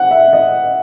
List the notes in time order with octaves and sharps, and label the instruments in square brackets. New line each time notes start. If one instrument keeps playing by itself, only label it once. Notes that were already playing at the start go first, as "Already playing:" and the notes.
Already playing: [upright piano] F#5
E5
D#5